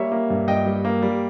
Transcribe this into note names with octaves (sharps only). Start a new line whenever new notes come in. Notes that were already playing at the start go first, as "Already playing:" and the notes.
Already playing: G3 A#3 C#5 E5
A#3
G2
G2 D#5 G5
G3
A#3
G3